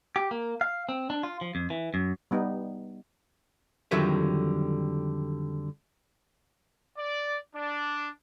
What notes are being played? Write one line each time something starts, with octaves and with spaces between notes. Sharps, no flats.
G4
A#3
F5
C4
D4
F4
F3
F2
E3
F#2
G3 B3 D#4
F2 D3 D#3 F#3 G3 E5
D5
D4